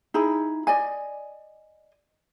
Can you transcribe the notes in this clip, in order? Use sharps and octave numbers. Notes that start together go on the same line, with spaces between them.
D#4 E4 G#4 B5
D5 D#5 G#5